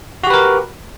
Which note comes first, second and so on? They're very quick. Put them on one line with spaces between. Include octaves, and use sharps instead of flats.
F#4 G4 B4 A#4